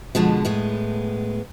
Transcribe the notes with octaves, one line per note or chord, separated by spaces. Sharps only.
B2 D3 F3 G#3
A2 G#3 B3